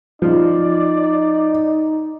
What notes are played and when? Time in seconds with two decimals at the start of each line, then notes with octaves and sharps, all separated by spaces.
0.22 F3 D#4 D5